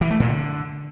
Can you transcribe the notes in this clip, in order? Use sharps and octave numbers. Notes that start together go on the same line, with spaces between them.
E3
A3
A#2
D3